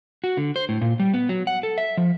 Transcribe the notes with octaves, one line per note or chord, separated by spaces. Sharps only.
F#4
D3
C5
A2
A#2
G3
B3
F#3
F#5
A4
E5
F3